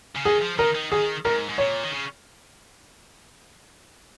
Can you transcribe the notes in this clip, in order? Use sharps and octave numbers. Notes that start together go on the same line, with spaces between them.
C#3
D#3 G#4
F3
D#3 A#4
D#3
D#3 G#4
G#2 A#4
G#2
A#2 C#5
D#3
C#3